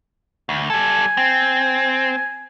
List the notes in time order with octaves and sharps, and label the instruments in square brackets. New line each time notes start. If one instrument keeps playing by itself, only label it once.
[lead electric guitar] D2
[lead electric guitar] G3 A4 [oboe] G#5
[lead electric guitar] C4